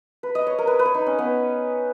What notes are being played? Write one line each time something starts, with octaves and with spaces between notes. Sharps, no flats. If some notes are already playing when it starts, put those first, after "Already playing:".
B4
D#5
C#5
A#4
B4
B4
C#5
D#4
C#4
B3